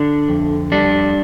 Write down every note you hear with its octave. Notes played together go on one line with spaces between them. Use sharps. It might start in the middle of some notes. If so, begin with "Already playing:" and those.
Already playing: D3 D4
F2
G3 D4